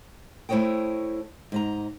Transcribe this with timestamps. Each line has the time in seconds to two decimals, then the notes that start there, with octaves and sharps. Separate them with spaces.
0.49 A3 E4 C5 C#5 D#5 G5
1.52 G#2 D#5 A#5